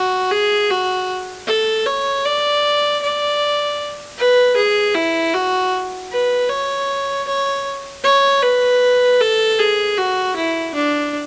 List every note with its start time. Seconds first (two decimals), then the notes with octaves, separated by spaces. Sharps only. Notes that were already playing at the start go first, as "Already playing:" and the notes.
Already playing: F#4
0.31 G#4
0.70 F#4
1.46 A4
1.86 C#5
2.25 D5
3.02 D5
4.18 B4
4.56 G#4
4.94 E4
5.33 F#4
6.10 B4
6.49 C#5
7.27 C#5
8.03 C#5
8.42 B4
9.20 A4
9.58 G#4
9.97 F#4
10.36 E4
10.74 D4